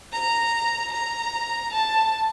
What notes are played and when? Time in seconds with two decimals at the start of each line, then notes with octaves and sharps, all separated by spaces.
0.12 A#5
0.92 A#5
1.72 A5